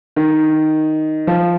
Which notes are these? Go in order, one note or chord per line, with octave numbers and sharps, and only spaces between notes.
D#3
F3